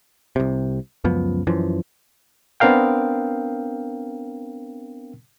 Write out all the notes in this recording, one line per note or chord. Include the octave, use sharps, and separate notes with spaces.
C2 C3
C#2 F#2 F3 B3
F#2 E3 F3
B3 C4 D4 A#4 F5 G5